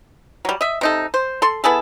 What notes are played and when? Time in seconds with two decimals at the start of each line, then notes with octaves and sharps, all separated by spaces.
0.45 F#3 G3
0.61 D#5 E5
0.81 C3 D#4 A4
1.14 C5
1.42 A4 C6
1.64 B3 E4 G#4 A4